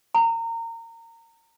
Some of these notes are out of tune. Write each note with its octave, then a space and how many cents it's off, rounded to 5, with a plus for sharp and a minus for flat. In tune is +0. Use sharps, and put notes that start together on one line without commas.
A#5 -25